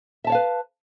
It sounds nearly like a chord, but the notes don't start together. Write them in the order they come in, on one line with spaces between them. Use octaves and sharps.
E5 A5 C#5 F5 B4